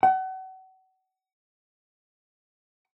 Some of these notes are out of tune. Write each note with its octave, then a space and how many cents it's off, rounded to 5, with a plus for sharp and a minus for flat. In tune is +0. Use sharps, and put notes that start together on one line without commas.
F#5 +35